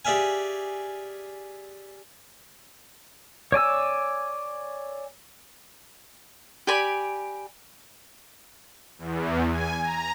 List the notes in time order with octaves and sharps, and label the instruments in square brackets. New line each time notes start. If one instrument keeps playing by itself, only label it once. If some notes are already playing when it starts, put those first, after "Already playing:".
[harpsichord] G4 G#4 D5 E5 F5 G#5
[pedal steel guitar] C#5 D5 G#5 E6
[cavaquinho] G4 D5 G#5 B5
[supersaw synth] E2
G#5
A#5